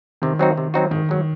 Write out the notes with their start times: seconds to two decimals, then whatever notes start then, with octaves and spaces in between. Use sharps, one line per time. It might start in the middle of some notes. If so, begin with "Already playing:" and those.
0.22 C3 D#3
0.39 F#3 C4 D#4 F#4
0.58 C3
0.74 F#3 C4 D#4 F#4
0.91 G#1 D#3
1.09 G#2 F#3